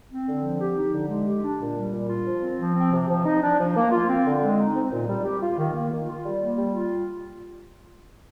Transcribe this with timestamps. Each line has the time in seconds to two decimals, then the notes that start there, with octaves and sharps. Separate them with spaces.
0.10 C4
0.27 D3
0.43 F3
0.60 G4
0.76 D#4
0.93 D3
1.09 G#3
1.26 G4
1.43 D4
1.60 A#2
1.76 G3
1.92 A#2
2.08 F4
2.26 F3
2.41 C4
2.58 F3
2.75 C4
2.91 C3
3.08 F3
3.25 D#4
3.42 D4
3.58 F3
3.75 A#3
3.91 F4
4.07 C4
4.24 D3
4.41 G#3
4.58 D#4
4.74 C4
4.91 A#2
5.08 G3
5.24 G4
5.40 F4
5.58 D#3
5.74 A#3
5.91 D#3
6.07 F4
6.24 G3
6.41 A#3
6.56 G3
6.73 F4